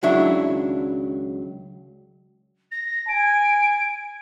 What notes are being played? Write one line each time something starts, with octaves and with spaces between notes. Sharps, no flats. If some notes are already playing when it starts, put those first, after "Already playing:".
C#2 D#3 F#3 D4 E4 E5
A#6
G#5 D7